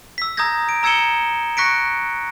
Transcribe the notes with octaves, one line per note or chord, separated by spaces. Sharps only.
E6 B6
A#5 D#6 E6 G6 G#6 A#6
D7
A#5 E6 G#6 C#7 E7 G7
C#6 F#6 A#6 B6 C#7 D7